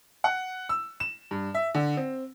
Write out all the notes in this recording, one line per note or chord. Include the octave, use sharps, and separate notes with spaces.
F#5
E6
E7
G2
E5
D3
C4